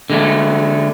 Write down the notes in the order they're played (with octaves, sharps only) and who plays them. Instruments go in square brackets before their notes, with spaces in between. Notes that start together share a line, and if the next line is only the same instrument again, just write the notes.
[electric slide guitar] D3 G#3 A3